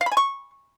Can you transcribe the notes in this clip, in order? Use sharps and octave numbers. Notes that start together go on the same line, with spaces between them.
F5
B5
G#5
C#6